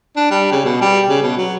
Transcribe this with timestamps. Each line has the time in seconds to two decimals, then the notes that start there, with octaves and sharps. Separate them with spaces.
0.16 D4
0.31 G3
0.52 C#3
0.65 B2
0.81 G3
1.09 C#3
1.22 B2
1.37 F#3